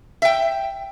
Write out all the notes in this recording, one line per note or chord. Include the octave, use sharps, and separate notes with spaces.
E5 G5